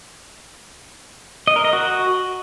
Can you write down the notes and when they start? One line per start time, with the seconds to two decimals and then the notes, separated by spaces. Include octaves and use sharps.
1.47 D#5
1.56 A#4
1.64 D#5
1.73 F#4